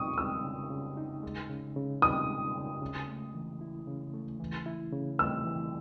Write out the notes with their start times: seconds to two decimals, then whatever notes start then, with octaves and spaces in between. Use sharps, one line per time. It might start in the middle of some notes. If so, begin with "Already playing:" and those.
Already playing: C#3 D#4 C#6 D#6
0.17 G#3 E6
0.44 C#3
0.70 C#3
0.97 D#4
1.23 G#3
1.50 C#3
1.76 C#3
2.02 D#4 D#6
2.29 G#3
2.55 C#3
2.82 C#3
3.08 A3
3.34 E3
3.61 E4
3.87 C#3
4.14 A3
4.40 E3
4.66 E4
4.93 C#3
5.19 A3 E6
5.46 E3